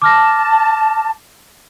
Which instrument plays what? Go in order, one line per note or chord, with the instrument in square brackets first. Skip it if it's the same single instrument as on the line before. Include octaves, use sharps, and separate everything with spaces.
[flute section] A5 [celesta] D6 F6 A#6